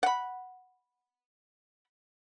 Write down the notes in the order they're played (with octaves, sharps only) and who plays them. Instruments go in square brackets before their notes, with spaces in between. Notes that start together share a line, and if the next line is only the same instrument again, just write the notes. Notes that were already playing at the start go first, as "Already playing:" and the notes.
[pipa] F#5 B5